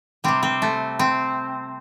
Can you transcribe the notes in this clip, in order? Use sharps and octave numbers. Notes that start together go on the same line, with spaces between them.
C3 G3 C4
C4
A3
C4